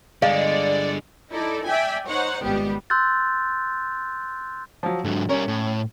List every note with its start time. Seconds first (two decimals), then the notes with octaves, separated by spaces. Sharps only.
0.22 G2 D3 G#3 D5 F5
1.31 D#4 E4 A4 D5
1.66 D5 E5 G5 G#5
2.08 D#4 C5 C#5 F#5
2.43 G#1 C#2 G3 B3 G4
2.90 C6 E6 F#6 G6 A6
4.83 F3 F#3
5.04 G#2 D3 F#3
5.29 G3 C#4 A#4 C#5
5.48 A2